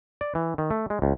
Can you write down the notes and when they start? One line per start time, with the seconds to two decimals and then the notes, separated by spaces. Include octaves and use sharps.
0.21 D5
0.35 E3
0.58 D#3
0.71 A3
0.90 G#3
1.02 C#2